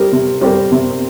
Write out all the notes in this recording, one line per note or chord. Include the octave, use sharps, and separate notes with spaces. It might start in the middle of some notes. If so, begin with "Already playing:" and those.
Already playing: G3 C4 G4 A#4
C3
G3 C4 G4 A#4
C3